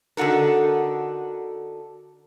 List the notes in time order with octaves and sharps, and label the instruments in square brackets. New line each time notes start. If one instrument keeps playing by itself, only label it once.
[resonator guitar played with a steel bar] D3 D#4 F#4 A4 A#4